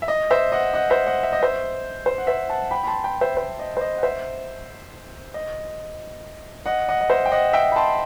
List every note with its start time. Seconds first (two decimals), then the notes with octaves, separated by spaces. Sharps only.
0.02 E5
0.08 D#5
0.30 C5 E5
0.52 D#5 F#5
0.73 D#5 F#5
0.90 C5 E5
1.06 D#5 F#5
1.23 E5
1.33 D#5
1.42 C5 E5
2.06 C5
2.18 F#5
2.27 C5 E5
2.50 F#5 A5
2.71 G5 B5
2.84 B5
2.87 A5 C6
3.04 G5 B5
3.21 C5 E5
3.37 C5
3.59 D#5
3.77 C5
3.81 D#5
3.97 F#5
4.03 C5 E5
5.34 D#5
6.66 D#5 F#5
6.89 D#5 F#5
7.01 D#5
7.10 C5 E5
7.26 G5
7.32 D#5 F#5
7.53 E5 G5
7.72 B5
7.76 A5 C6